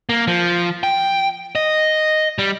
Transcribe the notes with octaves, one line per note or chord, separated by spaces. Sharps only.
A#3
F3
G5
D#5
G3